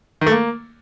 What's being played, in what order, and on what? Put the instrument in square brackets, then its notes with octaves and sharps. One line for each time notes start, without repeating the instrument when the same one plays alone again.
[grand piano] D#3
A3
A#3